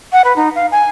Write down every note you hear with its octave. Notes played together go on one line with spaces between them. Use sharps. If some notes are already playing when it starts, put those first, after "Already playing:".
F#5
B4
D#4
F5
G#5